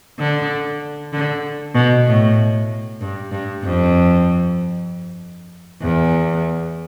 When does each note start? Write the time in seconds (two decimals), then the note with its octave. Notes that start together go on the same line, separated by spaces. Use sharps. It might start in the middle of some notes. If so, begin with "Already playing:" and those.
0.19 D3
1.13 D3
1.75 B2
2.07 A2
3.01 G2
3.31 G2
3.64 F2
5.82 E2